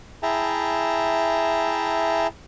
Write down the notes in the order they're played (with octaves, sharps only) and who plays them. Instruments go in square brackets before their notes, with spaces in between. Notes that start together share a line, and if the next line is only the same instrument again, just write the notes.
[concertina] E4 G#4 E5 G5 A5 A#5